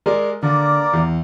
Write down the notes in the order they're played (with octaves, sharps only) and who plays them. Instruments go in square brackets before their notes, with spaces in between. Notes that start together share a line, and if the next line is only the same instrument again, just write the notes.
[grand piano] G#3 A#4 D5
[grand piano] D3 [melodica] A#3 A#4 D5
[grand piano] E2